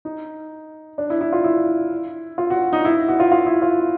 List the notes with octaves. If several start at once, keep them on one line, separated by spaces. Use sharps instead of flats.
D#4
D4
E4
E4
F4
E4
F4
F#4
D#4
E4
F#4
F4
F4
E4
F4